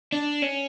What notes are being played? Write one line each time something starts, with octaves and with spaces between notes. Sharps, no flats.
D4
C#4